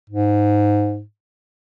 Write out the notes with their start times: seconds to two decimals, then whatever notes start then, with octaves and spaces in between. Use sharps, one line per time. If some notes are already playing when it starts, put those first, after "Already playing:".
0.10 G#2